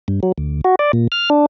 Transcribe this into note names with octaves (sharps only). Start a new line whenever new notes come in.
G2
F#3
D2
F#4
D5
A#2
F6
D4